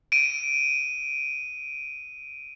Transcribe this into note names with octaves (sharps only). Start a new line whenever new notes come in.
D7 D#7